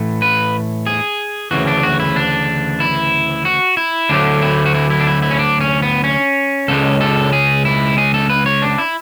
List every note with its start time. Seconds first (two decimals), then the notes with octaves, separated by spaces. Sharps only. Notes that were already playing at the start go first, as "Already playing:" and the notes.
Already playing: A2 E3 A3
0.22 B4
0.86 G#4
1.51 D2 C#3 E3 F#4
1.67 D4
1.83 F#4
2.00 E4
2.16 D4
2.80 E4
3.45 F#4
3.77 E4
4.09 D2 D3 F#3 A3 D4
4.42 E4
4.66 F#4
4.74 E4
4.90 E4
5.00 D4
5.07 E4
5.22 E4
5.31 C#4
5.39 D4
5.61 C#4
5.82 B3
6.04 C#4
6.68 C#2 C#3 G#3 A4
7.01 A4
7.33 G#4
7.65 E4
7.98 G#4
8.14 A4
8.30 B4
8.46 C#5
8.62 D4
8.78 E4